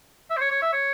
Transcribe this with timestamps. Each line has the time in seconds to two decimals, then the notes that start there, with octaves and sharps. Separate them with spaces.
0.30 E5
0.37 C5
0.41 C#5
0.51 C#5
0.62 E5
0.73 C#5